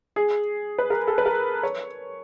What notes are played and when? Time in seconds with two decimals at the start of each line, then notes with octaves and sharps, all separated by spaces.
0.16 G#4
0.78 B4
0.90 A#4
1.07 A4
1.18 B4
1.26 A#4
1.63 C#5